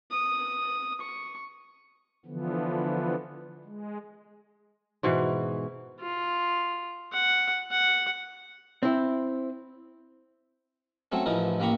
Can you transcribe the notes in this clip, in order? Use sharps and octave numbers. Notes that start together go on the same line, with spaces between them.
D#6
C#6
D3 E3 F3 B3
G#3
G#2 B2 E3
F4
F#5
F#5
C4 E4
F#3 A3 C4 C#4
A1 E3 F3 D#4 A#4
A1 A#3 G5 A#5 B5 C#6